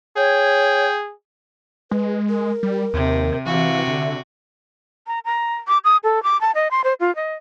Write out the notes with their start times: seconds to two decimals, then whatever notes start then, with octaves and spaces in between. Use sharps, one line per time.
0.17 G#4 C#5 G5
1.91 G#3 B4
2.29 A#4
2.63 G3
2.94 D#2 C3
3.46 C3 E3 F#4 F5
3.88 D3 E5
5.07 A#5
5.25 A#5
5.68 D6
5.84 D#6
6.04 A4
6.23 D6
6.41 A5
6.55 D#5
6.71 C6
6.84 C5
7.00 F4
7.15 D#5